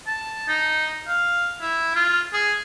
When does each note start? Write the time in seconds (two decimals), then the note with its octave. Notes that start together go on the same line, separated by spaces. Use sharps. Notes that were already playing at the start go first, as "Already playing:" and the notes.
0.07 A5
0.48 D#4
1.08 F5
1.61 E4
1.95 F4
2.33 G#4